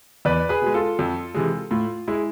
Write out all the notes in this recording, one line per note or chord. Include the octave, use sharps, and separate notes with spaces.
E2 B4 D5
G#4 B4
B2 G#3
F4 A4
F2
C3 E3 G#3
A2 F4
G#3 E4